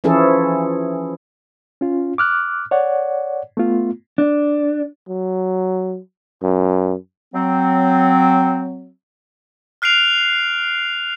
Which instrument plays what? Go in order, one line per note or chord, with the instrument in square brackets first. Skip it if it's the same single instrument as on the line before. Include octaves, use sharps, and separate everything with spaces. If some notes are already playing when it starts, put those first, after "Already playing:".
[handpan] E3 F3 C#4 E4 G#4 A4
[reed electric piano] C#4 F4
D6 F6 F#6
C#5 D5 F#5
A3 B3 F4
[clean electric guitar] D4
[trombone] F#3
F#2
[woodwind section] F#3 C4
[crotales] F6 F#6 C7 D7 F7